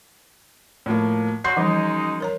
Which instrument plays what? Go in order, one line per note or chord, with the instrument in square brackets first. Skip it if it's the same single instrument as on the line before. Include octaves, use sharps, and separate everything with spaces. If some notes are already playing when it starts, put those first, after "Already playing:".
[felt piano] A2 F3 A#3
[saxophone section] F#3 F#4 [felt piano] C6 G6 C7
[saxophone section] F#2 G#3 D#4 [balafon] E3 F3 G3
[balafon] A#4 C#5 A#5